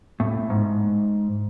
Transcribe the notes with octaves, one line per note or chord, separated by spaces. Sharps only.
A2
G#2